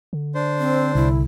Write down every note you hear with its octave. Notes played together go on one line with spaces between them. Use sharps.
D3
D4 C5
C4
C2 E4